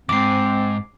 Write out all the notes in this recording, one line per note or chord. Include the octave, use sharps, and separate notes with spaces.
E2 G#2 C4 D6 C7